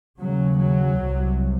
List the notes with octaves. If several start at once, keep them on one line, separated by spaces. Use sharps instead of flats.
D#2 C#3 F#3
F#3
C2 C3